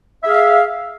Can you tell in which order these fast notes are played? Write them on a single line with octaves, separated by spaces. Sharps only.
E5 G#4 F5